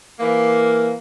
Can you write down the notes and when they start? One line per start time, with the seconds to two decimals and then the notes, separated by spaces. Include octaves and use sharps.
0.19 E3 A#3